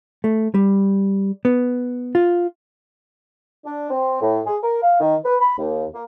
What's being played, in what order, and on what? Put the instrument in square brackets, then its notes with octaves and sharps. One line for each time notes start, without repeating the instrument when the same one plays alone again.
[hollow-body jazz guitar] A3
G3
B3
F4
[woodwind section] D4
C4
A2
G#4
A#4
F5
D#3
B4
B5
D#2
A#3